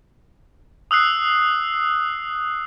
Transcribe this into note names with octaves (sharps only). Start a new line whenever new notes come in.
D#6 E6 F#6 C7